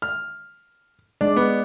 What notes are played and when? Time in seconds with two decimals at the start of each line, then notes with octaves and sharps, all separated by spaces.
0.02 F6
1.21 G#3 D4 D5
1.37 B3